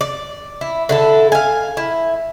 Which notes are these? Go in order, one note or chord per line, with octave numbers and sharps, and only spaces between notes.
D5
E4
D3 E4 A4
F5 G#5
E4